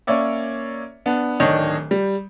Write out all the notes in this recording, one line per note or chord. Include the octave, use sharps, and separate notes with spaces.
A#3 C#4 C#5 D5 E5
B3 D4
D1 D#3 D4 C#5 D#5
G3